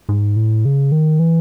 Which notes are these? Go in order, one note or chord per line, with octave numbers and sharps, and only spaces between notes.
G#2
A2
C#3
D#3
E3